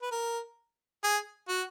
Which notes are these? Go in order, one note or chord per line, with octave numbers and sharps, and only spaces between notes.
B4
A#4
G#4
F#4